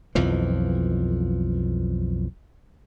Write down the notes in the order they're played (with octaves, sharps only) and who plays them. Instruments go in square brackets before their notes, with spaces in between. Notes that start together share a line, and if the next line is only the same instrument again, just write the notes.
[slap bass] B1 F2 E3 F3